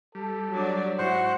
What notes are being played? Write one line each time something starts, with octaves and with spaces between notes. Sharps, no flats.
G3 A4
F#3 D4 D5
G#2 E4 F#4 C5 F#5 C#6